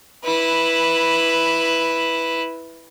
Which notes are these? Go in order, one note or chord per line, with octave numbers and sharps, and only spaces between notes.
E4 B4